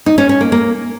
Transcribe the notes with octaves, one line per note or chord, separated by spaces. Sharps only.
D#4
C#4
C#4
A#3
A#3